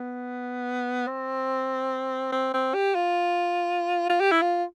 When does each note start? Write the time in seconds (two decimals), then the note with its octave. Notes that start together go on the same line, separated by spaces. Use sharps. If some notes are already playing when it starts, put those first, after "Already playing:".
Already playing: B3
1.07 C4
2.32 C4
2.54 C4
2.74 G4
2.95 F4
4.09 F4
4.20 G4
4.31 E4
4.42 F4